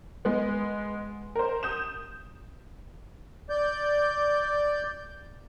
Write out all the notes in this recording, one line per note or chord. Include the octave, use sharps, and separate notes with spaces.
G#3 B3
A#4 C5
D#6 G6 E7
D5 G6